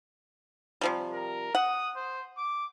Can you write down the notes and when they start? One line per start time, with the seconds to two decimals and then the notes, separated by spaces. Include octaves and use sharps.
0.81 C3 F3 G3
1.12 A#4
1.55 F#5 D#6
1.96 C5
2.37 D6